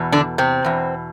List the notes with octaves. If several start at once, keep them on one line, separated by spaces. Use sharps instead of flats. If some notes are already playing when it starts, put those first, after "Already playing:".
Already playing: E2 B2
D3 D4
C3 C4
E2 B2